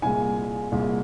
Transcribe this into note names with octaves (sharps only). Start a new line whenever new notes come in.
C2 A#2 G#3 G#5
C2 A#2 G#3